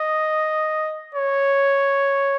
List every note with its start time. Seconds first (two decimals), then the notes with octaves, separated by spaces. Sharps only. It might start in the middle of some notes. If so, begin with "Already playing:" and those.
Already playing: D#5
1.15 C#5